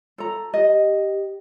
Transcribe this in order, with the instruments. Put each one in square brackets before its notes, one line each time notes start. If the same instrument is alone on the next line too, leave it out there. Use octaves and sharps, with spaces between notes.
[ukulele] A4 A#5
[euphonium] G4 [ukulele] D#5